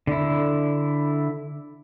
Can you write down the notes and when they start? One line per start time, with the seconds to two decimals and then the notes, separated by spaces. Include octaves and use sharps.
0.07 D3 E4